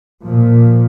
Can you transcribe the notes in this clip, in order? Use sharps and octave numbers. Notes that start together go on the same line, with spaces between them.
A#2 F3